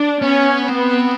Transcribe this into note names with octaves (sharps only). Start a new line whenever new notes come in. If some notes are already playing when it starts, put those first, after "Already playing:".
Already playing: D4
B3 C#4
B3 C4